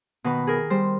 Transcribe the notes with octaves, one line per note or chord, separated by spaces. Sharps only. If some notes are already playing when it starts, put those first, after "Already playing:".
B2 D#3 B4 B5
G#4 A#4
G3 C5